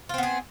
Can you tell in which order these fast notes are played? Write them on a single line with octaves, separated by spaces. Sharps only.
F4 C4 B3 G#4